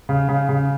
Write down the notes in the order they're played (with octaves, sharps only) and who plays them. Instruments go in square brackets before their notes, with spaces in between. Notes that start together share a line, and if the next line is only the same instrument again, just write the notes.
[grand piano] C#3
C#3
C#3